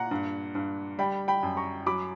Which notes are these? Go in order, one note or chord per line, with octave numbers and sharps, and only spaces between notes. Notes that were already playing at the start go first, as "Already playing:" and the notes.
Already playing: A#2 F#5 A#5
G2
G2
G3 G5 B5
G5 B5
F#2
A#5 C#6
F#3 B5 D6